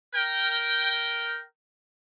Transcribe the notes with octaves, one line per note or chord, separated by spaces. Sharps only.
A#4 G5